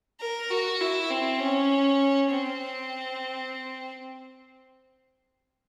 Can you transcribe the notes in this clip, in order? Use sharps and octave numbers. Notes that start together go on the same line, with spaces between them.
A#4
F#4
E4
C4
C#4
C4